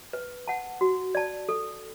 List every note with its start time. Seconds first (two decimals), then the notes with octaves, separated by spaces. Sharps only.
0.13 B4
0.48 F#5 A5
0.81 F#4
1.15 D5 A5
1.49 A4